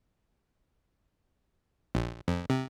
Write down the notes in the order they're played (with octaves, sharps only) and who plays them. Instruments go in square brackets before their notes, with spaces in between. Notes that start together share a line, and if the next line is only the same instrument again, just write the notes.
[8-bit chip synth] A#1
F2
C3